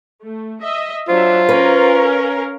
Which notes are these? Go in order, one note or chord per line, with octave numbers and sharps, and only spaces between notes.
A3
D#5 E5
F#3 D4 F4 C5 E5
C#4 A#4 B4 F5